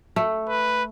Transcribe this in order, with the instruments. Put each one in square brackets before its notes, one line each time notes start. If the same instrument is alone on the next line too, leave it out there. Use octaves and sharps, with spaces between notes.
[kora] A3
[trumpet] B4